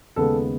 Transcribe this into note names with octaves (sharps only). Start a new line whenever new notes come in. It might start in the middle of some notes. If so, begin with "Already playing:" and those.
D#2 C#3 G#3 B3 A4